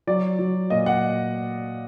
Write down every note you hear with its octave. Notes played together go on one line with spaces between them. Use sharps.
F#3 D5
F#3
A#2 D#5
F#5